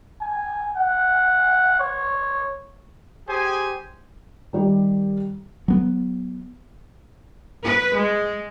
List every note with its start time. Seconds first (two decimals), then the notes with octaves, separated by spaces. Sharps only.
0.21 G#5
0.76 F#5
1.79 C#5
3.28 G4 G#4 C5 G5 G#5
4.53 D#3 G3 G4
5.68 F#3 B3
7.64 B4
7.98 G#3